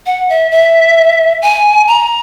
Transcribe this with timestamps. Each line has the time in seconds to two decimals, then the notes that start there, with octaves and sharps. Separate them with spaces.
0.06 F#5
0.30 E5
0.51 E5
1.42 G#5
1.87 A#5